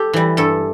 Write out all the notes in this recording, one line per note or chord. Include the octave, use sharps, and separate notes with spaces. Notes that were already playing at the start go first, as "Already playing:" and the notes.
Already playing: G4 A4
E3 G3
G2 A4